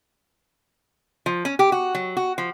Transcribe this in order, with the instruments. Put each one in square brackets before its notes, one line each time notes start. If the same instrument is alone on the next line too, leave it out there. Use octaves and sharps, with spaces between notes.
[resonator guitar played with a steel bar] F3
C#4
G4
F#4
F#3
F#4
F3